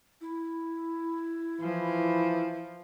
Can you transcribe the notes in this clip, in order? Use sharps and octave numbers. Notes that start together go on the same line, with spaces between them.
E4
E3 F3